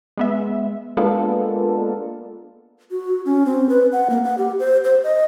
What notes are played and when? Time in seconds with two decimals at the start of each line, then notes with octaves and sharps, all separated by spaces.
0.17 G#3 B3 E5
0.97 G#3 A#3 B3 D4 F4 A4
2.91 F#4
3.25 C#4
3.46 C4
3.69 B4
3.92 F#5
4.10 A#3
4.24 F#5
4.38 G4
4.59 C5
4.85 C5
5.03 D#5